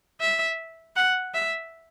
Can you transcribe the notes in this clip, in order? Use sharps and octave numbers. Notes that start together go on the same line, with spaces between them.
E5
F#5
E5